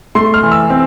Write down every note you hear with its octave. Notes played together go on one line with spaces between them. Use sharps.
A3 C6
F6
E3
E6
C4